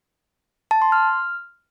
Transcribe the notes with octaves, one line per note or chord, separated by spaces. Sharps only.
A5
C6
F6